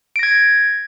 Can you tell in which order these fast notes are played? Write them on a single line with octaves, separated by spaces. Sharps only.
D7 A#6 G#6